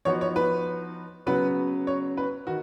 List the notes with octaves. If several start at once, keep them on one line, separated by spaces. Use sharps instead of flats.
F3 B3 D#4 F#4 C#5
C#5
B4
C#3 F#3 B3 F#4 B4
C#5
B4
D#3 F#4